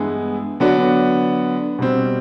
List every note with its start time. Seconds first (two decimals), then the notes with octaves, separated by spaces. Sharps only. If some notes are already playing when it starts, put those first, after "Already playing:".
Already playing: G2 E3 G#3 B3 E4
0.60 D3 F#3 B3 D4 F#4
1.79 B2 G3 C4